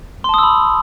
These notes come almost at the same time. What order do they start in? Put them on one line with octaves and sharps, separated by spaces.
C6 A5 D#6 E6 B5